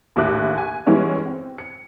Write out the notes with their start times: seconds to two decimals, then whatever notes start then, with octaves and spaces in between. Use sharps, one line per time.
0.16 A#1 D#2 A2 E5 D6 F#6
0.58 G#5
0.86 E3 G3 G#3 B3 C#4 E4
1.26 C4
1.58 C#7